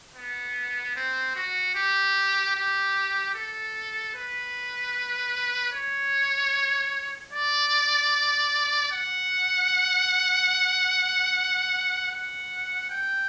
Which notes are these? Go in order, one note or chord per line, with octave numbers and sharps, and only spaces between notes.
B3
C4
F#4
G4
G4
A4
B4
C#5
D5
F#5
F#5
G5